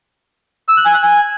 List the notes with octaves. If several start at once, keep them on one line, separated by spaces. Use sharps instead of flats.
E6
F#6
G#5
F#6
G#5